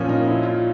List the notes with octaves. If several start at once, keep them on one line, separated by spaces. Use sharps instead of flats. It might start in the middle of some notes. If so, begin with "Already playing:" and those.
Already playing: A#2 F3 C#4
D#4
E4
F4